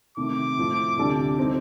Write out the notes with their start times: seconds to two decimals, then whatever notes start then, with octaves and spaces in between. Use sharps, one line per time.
0.17 C3 D#3 A3 D6
0.58 A2 F3 A3
0.97 D2 C3 G3 D4 A4
1.37 G3 C4 D#4